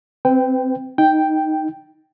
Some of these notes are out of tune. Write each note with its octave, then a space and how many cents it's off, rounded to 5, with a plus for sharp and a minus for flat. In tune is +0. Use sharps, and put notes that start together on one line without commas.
C4 +0 B4 +40 G5 +0
D#4 +0 G5 +0